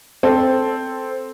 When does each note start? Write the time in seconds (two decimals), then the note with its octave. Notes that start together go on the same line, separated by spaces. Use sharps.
0.23 C4 A4